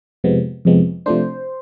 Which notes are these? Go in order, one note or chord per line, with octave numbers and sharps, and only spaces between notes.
F2 C3 F3 G#3 B3
F2 C3 F3 G#3 B3
C3 F3 A3 D4 C5